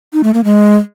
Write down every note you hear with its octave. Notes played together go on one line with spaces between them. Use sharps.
D#4
A3
A#3
G#3